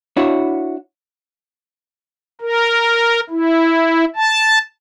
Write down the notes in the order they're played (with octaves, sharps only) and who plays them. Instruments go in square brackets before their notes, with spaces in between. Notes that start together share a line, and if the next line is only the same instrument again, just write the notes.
[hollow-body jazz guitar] D4 E4 F#4 C#5
[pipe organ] A#4
E4
A5